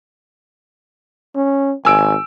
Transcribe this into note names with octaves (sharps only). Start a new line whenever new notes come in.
C#4
G#1 G#5 E6 D7